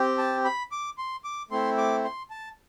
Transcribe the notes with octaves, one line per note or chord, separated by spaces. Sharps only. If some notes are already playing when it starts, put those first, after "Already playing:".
Already playing: C4 G4
A5
B5
D6
C6
D6
A3 C4 E4 C6
D6
C6
A5